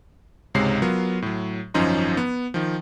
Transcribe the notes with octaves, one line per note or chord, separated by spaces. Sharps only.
C#2 G#2 C3 G#3 C#5 C7
F#3 B3 F4 A#4
A2 F#3
G#1 F#2 F3 C#4 D#4 C6
B3
D#3 F3